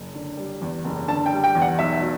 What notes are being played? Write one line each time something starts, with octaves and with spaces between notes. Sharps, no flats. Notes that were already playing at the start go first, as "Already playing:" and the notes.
Already playing: F#1
D3
G3
E2
F#1
D3 A5
G5
G3
G5
E2
F#5
B1 E5
F#3